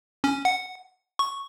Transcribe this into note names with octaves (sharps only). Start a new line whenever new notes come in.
C#4
F#5
C#6